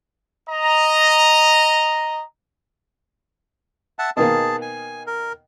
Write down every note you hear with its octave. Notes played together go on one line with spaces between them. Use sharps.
D#5 A#5
E5 F#5 A5
B2 D#3 A#3 G#4 A5
G#5
A#4